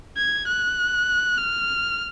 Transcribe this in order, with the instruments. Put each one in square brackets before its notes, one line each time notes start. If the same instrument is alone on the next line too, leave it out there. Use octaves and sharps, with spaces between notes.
[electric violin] G#6
F#6
F6